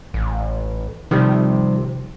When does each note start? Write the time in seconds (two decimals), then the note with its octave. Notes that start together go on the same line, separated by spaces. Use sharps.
0.14 A1
1.11 C3 D#3 F3 G3